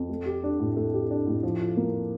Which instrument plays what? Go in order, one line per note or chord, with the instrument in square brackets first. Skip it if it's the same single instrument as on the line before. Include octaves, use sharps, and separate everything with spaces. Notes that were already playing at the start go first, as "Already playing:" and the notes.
Already playing: [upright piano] F2
A3
G4
D4
A2
A3
G4
D4
A2
F3
F4
A#3